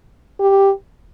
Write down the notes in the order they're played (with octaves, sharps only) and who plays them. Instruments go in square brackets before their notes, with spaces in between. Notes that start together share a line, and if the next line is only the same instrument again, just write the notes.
[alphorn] G4